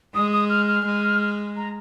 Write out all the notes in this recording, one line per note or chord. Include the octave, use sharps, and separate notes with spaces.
G#3 D#6
D#6
F6
F6
G#3
A#5